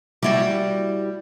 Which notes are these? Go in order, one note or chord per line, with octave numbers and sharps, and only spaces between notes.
G3 E4 F#4